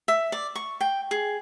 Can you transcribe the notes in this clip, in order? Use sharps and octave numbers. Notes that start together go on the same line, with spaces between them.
E5
D5
C#6
G5
G#4